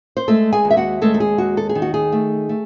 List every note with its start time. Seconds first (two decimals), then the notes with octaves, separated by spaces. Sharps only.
0.17 C5
0.28 G#3 A3 A4
0.52 G#4 G#5
0.65 D#2
0.71 E5
0.77 F#4 F#5
1.02 G#3 A3 A4
1.14 A4
1.20 G#4
1.38 D#2 F#4
1.57 A4
1.69 G#4
1.75 D#3
1.82 F#4
1.94 G#4
2.12 A3
2.49 A3